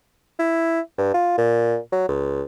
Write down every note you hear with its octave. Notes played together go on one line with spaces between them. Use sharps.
E4
G2
F4
A#2
F#3
C#2